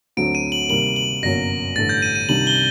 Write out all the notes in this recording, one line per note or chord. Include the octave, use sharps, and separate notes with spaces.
D2 D3 F#3 A3 C4 D7
D#7
F#7
C3 D#3 G3 A#3 F#7
F#7
G1 F#2 F#3 A#3 A#6
A1 G2 D3 A3 A6
G6
D#7
D#7
C2 C3 D#3 G3 D4 F#7
G7